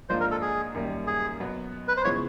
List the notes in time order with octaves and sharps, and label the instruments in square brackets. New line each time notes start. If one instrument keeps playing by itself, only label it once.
[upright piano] G#2 F3 A#3 D4 F4 [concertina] C5
[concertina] A#4
A4
G#4
[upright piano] F#2 D#3 G3 A#3
[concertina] G#4
[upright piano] B2 F#3 B3
[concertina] B4
C5
[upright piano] C#3 F3 G#3 B3 E4 [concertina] C#5